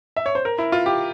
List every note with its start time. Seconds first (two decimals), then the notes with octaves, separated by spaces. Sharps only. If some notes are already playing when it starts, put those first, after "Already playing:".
0.17 E5
0.26 C#5
0.35 C5
0.45 A#4
0.58 E4
0.72 F4
0.86 G4